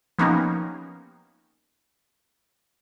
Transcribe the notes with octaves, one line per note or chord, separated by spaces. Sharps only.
F3 A#3 B3 C#4 D#4 G4